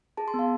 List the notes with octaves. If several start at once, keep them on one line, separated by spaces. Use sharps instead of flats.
G#4 A5
C6
B3
F5